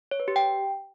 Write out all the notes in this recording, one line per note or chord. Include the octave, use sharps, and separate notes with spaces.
C#5
B4
G4
G5